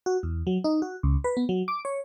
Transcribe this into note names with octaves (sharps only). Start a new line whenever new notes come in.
F#4
E2
F#3
D#4
F#4
C#2
B4
B3
F#3
D6
C#5